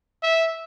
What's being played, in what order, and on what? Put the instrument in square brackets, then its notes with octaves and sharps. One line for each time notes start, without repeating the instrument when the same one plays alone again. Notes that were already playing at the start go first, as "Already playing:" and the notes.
[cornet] E5